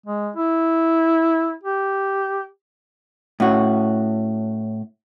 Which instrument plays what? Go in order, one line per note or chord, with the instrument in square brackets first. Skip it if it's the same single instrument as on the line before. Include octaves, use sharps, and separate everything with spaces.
[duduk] G#3
E4
G4
[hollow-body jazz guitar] A2 C#4 F#4